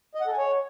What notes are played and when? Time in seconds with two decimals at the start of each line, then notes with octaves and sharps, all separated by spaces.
0.15 D#5
0.21 F#5
0.27 A4
0.32 G#5
0.38 C#5